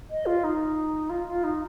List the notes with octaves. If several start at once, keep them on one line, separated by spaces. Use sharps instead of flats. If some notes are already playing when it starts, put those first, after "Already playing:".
D#5
F4
D#4
F4
F4
D#4